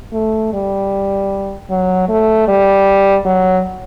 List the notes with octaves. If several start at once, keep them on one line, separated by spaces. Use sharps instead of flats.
A3
G3
F#3
A3
G3
F#3